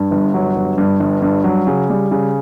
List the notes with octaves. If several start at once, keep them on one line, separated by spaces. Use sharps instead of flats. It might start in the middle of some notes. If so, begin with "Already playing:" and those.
Already playing: G2
G1
F#3
G1
G2
G1
G2
F#3
C#3
G3
C#3